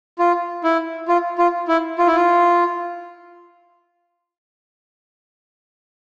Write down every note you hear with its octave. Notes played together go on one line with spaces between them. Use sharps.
F4
E4
F4
F4
E4
F4
E4
F4